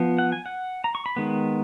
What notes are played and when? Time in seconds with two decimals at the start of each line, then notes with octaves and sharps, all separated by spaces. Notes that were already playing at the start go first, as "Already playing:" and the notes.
Already playing: F3 B3
0.18 F#5
0.32 G#5
0.46 F#5
0.84 A#5
0.95 C#6
1.06 B5
1.16 D#3 G#3 B3